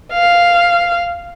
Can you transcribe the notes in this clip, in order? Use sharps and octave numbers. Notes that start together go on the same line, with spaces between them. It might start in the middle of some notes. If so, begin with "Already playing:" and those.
F5